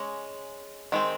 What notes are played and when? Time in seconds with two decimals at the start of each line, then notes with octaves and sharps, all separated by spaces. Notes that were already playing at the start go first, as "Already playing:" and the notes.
Already playing: G#3 C#4 D#5
0.92 D#3 G#3 C4